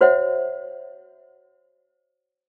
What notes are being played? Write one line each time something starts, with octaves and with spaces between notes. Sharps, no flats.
F#4 C5 C#5 E5 F#5